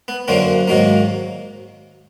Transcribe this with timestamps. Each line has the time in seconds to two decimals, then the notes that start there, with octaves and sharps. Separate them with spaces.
0.08 B3
0.28 F#2 D3 F#3 A#3 C4
0.68 G#2 D#3 F#3 A#3